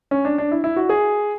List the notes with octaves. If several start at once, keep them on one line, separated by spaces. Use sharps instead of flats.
C#4
D4
D4
E4
E4
F#4
G#4